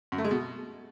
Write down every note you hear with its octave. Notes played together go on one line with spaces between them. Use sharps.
F#2
A3
G#3
B2